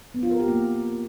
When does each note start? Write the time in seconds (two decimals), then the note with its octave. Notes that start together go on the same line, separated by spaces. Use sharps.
0.14 B3
0.23 F4
0.31 A#4
0.40 G4
0.48 A#3